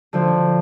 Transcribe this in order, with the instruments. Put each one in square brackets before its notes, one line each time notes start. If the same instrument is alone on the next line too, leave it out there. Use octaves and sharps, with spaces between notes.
[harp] D3 F3